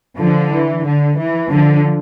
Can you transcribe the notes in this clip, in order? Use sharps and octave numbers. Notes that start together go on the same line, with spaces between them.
D3 F3
E3
D3
E3
D3 F3